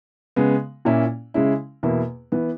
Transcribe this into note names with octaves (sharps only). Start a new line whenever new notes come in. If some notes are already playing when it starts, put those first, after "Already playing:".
C#3 G#3 B3
A#2 A#3 C#4 E4
C#3 G#3 C#4 E4
E2 B2 A#3 E4
E3 B3